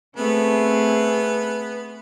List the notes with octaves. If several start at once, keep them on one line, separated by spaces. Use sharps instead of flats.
A3 B3 C4 G#4